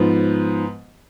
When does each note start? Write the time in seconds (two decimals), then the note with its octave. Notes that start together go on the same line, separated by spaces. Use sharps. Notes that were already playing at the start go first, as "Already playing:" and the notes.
Already playing: G#2 F3 B3